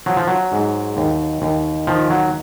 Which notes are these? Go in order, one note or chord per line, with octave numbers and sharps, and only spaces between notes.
F3 F#3
F3
F#3
G#2
D#2
D#2
D#3 F3
F#3